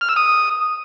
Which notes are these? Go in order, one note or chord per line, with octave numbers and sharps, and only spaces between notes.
F6
E6
D#6